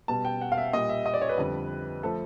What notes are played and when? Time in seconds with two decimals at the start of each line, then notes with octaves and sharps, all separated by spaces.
0.08 B2 G3 A5
0.25 G5
0.41 F#5
0.52 F5
0.58 E5
0.73 A#2 G3 D#5
0.89 E5
1.06 D#5
1.14 D5
1.22 C#5
1.29 B4
1.37 F2 D3 G3
2.03 F3 A3 A4